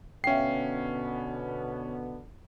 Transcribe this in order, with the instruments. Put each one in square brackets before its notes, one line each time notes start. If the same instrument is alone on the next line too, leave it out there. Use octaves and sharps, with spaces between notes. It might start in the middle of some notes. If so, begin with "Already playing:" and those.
[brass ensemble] B2 D3 B3 [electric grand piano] C#4 C7 [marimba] E5 F5 G5